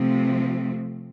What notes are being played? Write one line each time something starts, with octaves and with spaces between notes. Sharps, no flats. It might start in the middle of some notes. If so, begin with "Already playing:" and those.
Already playing: C3 F3 A3 C4